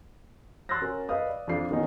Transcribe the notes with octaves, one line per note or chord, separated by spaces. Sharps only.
C6 E6 F#6 A6 A#6
C#4 F#4 A#4
B4 D#5 F5 D#6
D5
F2 D4 F4 C7
D#3 A#3 B3 C#4 D#4